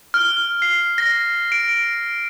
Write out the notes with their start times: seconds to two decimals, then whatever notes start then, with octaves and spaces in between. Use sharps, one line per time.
0.14 F6
0.62 C7
0.98 A#6
1.52 D7